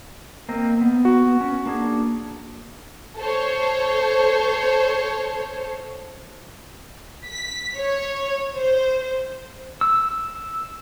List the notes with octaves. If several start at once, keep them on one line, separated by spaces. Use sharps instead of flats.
A#3 C4 D#5
B3
F#4
C#4
A#3 D4 G#4
A4 C5 C#5
B6
C#5
C5
E6